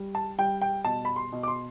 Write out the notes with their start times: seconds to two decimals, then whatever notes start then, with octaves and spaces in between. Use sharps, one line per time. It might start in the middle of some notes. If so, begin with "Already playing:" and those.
Already playing: G3
0.15 A5
0.38 G3 G5
0.61 G5
0.85 B2 A5
1.05 B5
1.16 C6
1.32 B2
1.43 D6
1.48 C6